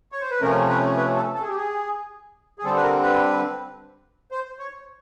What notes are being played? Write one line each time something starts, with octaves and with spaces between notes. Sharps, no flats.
C#5
C5
B4
C3 F3 A3 C#4 A#4
B4
B4
A4
A4
G#4
G4
G#4
G#4
D3 G3 C4 A4
B4
A#4
B4
C5
C#5